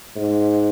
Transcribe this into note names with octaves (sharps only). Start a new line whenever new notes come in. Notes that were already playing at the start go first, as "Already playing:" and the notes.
G#2